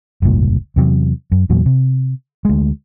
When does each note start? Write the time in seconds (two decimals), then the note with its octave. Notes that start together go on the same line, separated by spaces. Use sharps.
0.22 F1 C#2 G2 A#2
0.76 E2 C3 F#3
1.32 F#2
1.50 E2 A#2 F#3
1.66 C3
2.45 D2 G#3